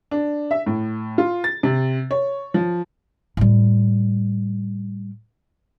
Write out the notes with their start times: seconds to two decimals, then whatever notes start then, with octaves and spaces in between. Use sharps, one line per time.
0.11 D4
0.51 E5
0.66 A2
1.18 F4
1.44 A6
1.63 C3
2.11 C#5
2.54 F3
3.37 A2 G3